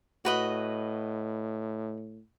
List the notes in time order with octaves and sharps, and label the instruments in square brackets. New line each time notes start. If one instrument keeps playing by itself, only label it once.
[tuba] A2 [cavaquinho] F#4 B4 D#5